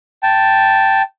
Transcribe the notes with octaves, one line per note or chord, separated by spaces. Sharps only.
G5 A5